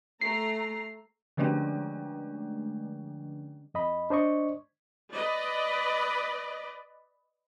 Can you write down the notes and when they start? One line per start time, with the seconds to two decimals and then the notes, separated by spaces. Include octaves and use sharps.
0.21 A3 A#5 C7
1.37 D3 F3 G#3 A3 C#4 D4
3.74 F2 D#5 B5
4.10 D4 C5 D5 D#5 C#6
5.13 B4 D5 D#5